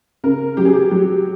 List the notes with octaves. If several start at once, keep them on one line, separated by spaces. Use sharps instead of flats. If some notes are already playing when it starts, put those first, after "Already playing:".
C#3 A#4
F#3 G4
G#4
G4
F#3